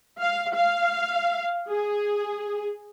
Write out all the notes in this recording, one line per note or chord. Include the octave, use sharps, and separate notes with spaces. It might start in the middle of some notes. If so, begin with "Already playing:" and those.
F5
F5
G#4